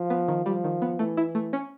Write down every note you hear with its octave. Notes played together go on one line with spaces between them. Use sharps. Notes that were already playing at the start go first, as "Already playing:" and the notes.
Already playing: F3
B3
D#3
F3 G3
D#3
B3
E3 A3
E4
A3
C#4